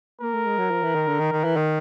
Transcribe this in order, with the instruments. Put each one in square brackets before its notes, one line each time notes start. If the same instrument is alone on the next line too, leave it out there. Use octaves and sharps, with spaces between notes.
[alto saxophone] A#3 [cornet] A#4
[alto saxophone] A3
G#3
F#3
F3
E3
D#3
D3
D#3
D#3
E3
D#3